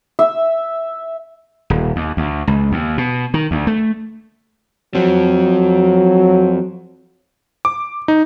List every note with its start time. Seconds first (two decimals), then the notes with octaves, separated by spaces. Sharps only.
0.19 E5
1.70 D#1
1.96 D#2
2.17 D2
2.47 C#2
2.72 D#2
2.98 B2
3.34 D#3
3.51 D2
3.67 A3
4.95 F3 F#3 C4
7.65 D6
8.08 D#4